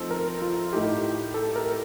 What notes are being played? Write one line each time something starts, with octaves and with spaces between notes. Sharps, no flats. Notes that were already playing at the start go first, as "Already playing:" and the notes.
Already playing: F3 A3 C4 D#4 A4
A#4
F4
A2 A3 D#4 G4
A4
A#4